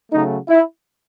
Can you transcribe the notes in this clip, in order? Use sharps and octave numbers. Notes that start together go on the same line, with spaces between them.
C#3 F#3 A3 D#4
E4